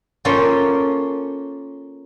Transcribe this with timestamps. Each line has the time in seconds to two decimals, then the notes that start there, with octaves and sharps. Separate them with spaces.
0.25 A#3 C#4 F4 A4 C5